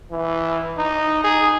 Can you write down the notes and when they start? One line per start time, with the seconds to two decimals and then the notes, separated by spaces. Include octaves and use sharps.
0.11 E3
0.78 D#4
1.24 G#4